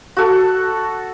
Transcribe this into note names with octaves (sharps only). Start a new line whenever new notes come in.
F#4 A4